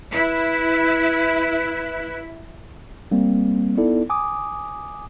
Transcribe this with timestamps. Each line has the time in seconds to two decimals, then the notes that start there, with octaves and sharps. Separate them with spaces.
0.13 E4 B4
3.11 G3 A#3 C4
3.77 B3 D#4 E4 A4 D5
4.10 G#5 D6 D#6